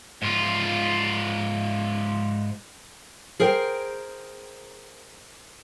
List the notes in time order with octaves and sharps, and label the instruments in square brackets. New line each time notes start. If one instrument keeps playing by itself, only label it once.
[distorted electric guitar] G#2 F4
[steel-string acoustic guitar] G#4 A#4 C5 G5